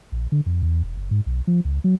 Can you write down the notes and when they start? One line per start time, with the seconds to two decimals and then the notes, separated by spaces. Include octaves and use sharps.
0.12 A#1
0.32 D3
0.46 F2
0.62 E2
0.83 E1
0.97 F#1
1.11 G#2
1.26 B1
1.47 F3
1.65 C#2
1.84 F#3